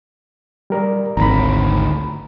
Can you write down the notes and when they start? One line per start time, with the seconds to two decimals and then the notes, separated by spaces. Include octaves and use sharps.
0.70 G3 A#4 D5
1.17 G#1 D2 A#5 B5